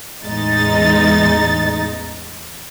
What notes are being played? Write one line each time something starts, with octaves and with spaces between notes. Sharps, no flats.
A1 E2 G#3 D#4 A6